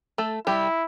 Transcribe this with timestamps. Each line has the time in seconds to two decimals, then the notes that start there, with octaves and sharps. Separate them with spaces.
0.18 A3 A4
0.47 G3 E4 G4